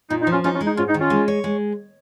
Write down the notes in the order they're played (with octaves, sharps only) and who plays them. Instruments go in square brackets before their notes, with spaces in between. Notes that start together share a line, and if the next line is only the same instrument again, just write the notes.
[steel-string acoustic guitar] A#2 [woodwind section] D#4
[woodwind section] D#4
[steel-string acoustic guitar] F3
[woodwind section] C#4 F4
[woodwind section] C#4 F4 [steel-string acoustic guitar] D#4
[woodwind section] C#4 F4
[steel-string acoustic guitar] G#3
[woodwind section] D#4
[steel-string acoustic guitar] G#2 [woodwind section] C#4 F4
[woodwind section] D#4
[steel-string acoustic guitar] D#3
[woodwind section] C#4 F4
[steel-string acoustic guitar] G#3
C#5
G#3